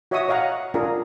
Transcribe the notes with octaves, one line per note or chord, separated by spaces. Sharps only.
F#4 C#5 D#5 E5 C#6 D#6
C#5 D#5 F5 F#5 A#5
D4 F4 G#4 A#4